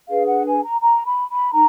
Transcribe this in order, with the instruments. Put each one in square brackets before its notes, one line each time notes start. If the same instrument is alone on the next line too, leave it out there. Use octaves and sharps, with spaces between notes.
[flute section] D4 G#4 B4 F5
F#5
G#5
A#5
A#5
B5
B5
D#4 A#5